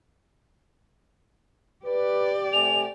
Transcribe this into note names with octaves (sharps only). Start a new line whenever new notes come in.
G4 B4 D5
C3 A3 G#5 F7